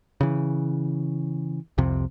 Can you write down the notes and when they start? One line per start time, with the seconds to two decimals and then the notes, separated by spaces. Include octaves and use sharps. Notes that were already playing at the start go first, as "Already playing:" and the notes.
0.21 C#3 E3
1.78 C2 F2 C3